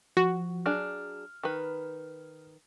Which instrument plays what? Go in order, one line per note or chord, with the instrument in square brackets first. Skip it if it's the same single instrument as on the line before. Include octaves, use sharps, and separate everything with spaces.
[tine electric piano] F3 [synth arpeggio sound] F#4
[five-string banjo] F#3 D4 G#4 [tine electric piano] F6
[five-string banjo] D#3 B4